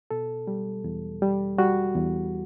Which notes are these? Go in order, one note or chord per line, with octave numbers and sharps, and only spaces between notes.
B2 A4
G3
E2
G3
G3 F#4
E2